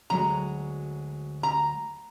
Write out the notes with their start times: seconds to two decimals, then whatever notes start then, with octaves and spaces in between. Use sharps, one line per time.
0.10 D2 F#3 G#3 A#5
1.43 A#5